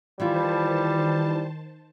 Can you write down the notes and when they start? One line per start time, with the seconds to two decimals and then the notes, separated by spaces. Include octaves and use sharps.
0.20 D#3 E3 G3 F4 C5 A5